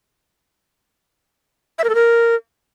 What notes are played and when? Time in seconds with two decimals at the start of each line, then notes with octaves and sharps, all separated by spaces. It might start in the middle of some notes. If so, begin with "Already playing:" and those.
1.79 E5
1.84 A#4
1.89 A4
1.95 A#4